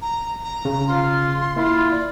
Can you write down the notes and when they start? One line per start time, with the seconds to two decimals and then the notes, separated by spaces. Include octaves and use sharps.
0.02 A#5
0.44 A#5
0.65 C#3
0.88 F4 C6
1.56 A#3 E4 F4
1.91 D5